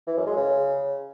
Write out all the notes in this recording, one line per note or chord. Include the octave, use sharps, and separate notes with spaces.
E3
F#2
G#3
C#3